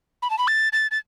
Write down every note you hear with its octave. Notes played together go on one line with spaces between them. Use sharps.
B5
A5
B5
A6
A6
A6